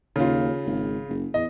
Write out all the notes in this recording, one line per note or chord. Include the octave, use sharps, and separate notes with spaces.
D#2 C#3 F4
G#1
F#1
E2 D#5